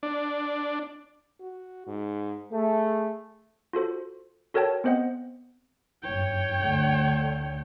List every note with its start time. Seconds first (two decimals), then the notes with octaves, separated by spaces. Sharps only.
0.03 D4
1.40 F#4
1.87 G#2
2.52 A3 G#4
3.73 F4 F#4 A4 C5
4.54 F#4 A4 A#4 C#5 G5 A5
4.84 B3 C4 C5 D#5 F#5
6.02 F#1 G2 C#5 G5
6.59 D2 D3